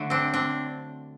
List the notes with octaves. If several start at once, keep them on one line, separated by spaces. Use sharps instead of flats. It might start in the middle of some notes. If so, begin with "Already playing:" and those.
Already playing: D3 F#3 A3
C4 D4
C4 D4